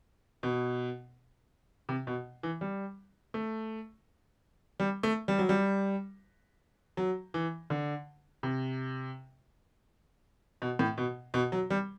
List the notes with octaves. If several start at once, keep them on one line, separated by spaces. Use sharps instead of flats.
B2
C3
B2
E3
G3
A3
G3
A3
G3
F#3
G3
F#3
E3
D3
C3
B2
A2
B2
B2
F#3
G3